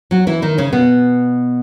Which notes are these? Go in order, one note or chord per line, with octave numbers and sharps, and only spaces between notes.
F#3 F#4
E3 E4
D#3 D#4
C#3 C#4
B2 B3